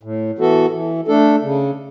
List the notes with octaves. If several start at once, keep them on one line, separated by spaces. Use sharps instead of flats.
A2
E3 B3 F#4 A4
E3
A3 D4 A4
C#3